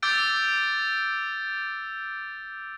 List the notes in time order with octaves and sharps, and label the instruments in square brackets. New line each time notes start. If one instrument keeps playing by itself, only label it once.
[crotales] D6 E6 G6 A6 D7